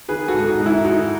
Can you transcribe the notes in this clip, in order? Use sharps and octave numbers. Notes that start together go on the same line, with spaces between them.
D#3 G#4 B4
F#4 A4
G#2
D#4 F#4
G#2
E4
D#3 D#4 F#4